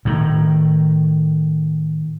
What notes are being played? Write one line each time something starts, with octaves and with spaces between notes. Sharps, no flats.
A2 D#3